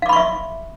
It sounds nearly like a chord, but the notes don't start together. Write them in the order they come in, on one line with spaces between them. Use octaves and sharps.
F5 D6 B5 C#6 E5